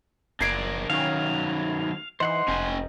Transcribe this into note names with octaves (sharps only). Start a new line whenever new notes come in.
F#1 D4 A#4 D5 G#6 C7 D7
D#3 F#3 C#4 F5
E3 D#4 C5 F#5 C6
F1 C#4 G5 G#5